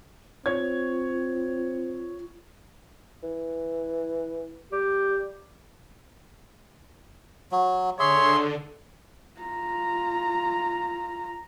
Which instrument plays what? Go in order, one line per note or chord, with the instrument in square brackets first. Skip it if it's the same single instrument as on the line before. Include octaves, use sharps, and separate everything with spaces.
[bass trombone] C4 [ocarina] F4 [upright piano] C#5 G#6
[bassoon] E3
[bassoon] G3 [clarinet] G4
[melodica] F#3
[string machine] D3 [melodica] G#4 E5 [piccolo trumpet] C#5 [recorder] C6
[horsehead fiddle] F4 A#5